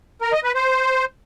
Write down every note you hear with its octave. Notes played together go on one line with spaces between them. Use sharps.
A#4
D#5
B4
C5